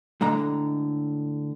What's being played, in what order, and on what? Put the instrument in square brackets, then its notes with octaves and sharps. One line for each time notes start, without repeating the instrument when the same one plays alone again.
[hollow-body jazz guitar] A2 D3 G#3 A#5